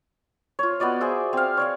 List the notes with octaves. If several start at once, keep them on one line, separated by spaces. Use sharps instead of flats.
F4 C#5
B3 F#4 D5 D#5
G#4 C5 E5
C4 F5
C#5 D5 F5